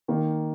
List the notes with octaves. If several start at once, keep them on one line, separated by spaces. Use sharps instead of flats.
D#3 A#3